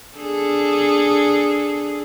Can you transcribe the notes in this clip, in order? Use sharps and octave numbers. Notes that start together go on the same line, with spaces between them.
D4 G#4 A4